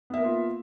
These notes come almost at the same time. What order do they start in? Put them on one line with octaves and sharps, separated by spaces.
B3 E5 A#4 A#3 F4